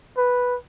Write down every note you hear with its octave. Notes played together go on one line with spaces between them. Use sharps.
B4